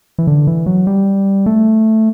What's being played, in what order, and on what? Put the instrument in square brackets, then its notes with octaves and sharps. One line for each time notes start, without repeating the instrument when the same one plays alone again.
[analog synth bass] E3
D3
E3
F#3
G3
A3